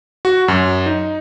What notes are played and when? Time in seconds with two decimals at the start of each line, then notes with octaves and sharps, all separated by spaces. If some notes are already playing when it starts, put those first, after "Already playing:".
0.25 F#4
0.48 F#2
0.86 D#4